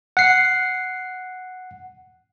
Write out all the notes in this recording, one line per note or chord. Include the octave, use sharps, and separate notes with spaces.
F#5 C7